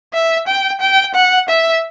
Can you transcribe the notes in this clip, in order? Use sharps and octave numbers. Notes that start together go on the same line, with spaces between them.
E5
G5
G5
F#5
E5